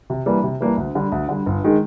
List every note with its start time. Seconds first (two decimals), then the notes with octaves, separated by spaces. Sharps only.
0.10 C3
0.26 E3 G3 A#3 D4
0.43 C3
0.60 E3 G3 A#3 D4
0.77 D2
0.95 D3 G3
1.12 D2
1.29 D3 G3
1.46 G1
1.64 D#3 G#3